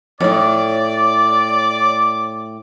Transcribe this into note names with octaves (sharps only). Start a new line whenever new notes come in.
F2 A2 C#5 D5 D6